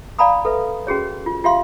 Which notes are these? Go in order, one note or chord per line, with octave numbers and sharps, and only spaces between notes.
D5 F5 G#5 A#5 B5 D#6
A4 B4 E5
C#4 F#4 G#4 C#5
F4
F4 G4 E5 F5 C6